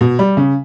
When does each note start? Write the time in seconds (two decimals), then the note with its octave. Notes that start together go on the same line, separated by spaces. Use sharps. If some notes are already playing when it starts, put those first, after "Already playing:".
0.01 B2
0.19 G3
0.37 C#3